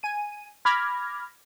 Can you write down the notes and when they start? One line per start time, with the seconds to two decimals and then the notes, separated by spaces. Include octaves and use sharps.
0.03 G#5 D#7
0.65 B5 D6 F6 G#6 A#6